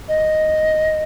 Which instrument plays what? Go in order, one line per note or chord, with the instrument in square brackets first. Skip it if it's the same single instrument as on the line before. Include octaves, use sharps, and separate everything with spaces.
[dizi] D#5